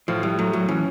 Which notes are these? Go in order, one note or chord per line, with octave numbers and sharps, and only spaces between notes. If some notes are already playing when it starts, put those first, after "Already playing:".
A2 F3
A2 G3
F#3 A3
F#3 A3
E3 C#4